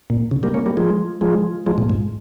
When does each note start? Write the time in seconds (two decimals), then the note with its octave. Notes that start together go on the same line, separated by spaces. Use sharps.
0.10 A#2
0.31 C#3
0.43 G3 A#3
0.54 A#3 C#4
0.66 G3 A#3
0.77 F3 G#3
1.21 F3 G#3
1.66 F3 G#3
1.78 A#2
1.90 G#2